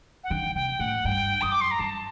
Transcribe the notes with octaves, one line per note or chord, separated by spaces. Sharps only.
F#5
D#3 G5
C3 G5
A2 F#5
G2 G5
F#2 D#6
D6
C6
A#5
G2 A5